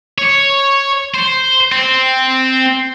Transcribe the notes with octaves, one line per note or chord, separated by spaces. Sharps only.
C#5
C5
C4